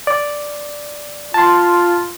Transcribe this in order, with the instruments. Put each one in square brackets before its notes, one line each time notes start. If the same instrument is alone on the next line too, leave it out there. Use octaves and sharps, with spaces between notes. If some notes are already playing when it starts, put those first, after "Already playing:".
[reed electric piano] D5
[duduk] F4 [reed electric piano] A5 C6